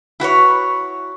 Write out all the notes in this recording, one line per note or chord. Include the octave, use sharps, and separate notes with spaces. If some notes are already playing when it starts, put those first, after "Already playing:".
E4 F#4 B4 C#5